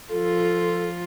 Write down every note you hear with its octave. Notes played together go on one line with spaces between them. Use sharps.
F3 F4 A4